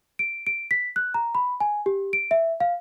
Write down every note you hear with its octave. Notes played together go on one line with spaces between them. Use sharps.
D7
D7
B6
F#6
A#5
B5
G#5
G4
D7
E5
F5